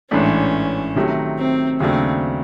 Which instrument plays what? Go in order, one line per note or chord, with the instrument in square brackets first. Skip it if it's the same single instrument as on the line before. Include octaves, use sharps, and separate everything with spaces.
[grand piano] A1 G#2 E3 A3 D4 [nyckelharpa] C#4
[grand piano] C3 D#3 F#3 A3
[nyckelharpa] C4
[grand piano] D#2 C#3 F#3 A3 D4 [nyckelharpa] C4